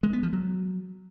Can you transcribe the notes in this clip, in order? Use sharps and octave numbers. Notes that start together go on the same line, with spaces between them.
G#3
B3
F3
F#3